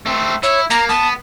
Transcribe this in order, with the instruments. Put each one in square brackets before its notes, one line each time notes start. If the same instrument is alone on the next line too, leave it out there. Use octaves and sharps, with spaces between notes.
[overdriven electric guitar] A3 C4
[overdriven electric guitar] E4 [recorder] C#5
[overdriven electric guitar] A#3 [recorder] A#5
[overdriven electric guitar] B3 [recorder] A5